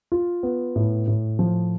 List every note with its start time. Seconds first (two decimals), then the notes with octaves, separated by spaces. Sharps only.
0.12 F4
0.43 B3
0.76 A2
1.08 A2
1.39 F3